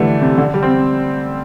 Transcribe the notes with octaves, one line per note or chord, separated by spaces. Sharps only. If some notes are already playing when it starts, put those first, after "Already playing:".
Already playing: D3 E3 G3 A3
C3
D3
G3
C4